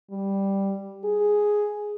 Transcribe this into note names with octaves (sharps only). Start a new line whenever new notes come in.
G3
G#4